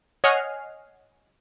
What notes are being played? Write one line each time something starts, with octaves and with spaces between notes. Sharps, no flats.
C#5 D#5 F#5 G#5 F6 C7